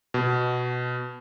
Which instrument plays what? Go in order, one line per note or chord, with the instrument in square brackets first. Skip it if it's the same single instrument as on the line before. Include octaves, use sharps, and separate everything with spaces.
[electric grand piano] B2